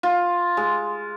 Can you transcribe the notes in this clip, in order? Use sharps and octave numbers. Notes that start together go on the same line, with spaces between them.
F4
G#3